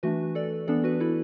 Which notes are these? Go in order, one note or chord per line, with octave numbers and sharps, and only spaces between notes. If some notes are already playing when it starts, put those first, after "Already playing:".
E3 A3 D4 F#4 B4
A4 D5
E3 B3 D4 A4 D5
F#4 B4
E4 A4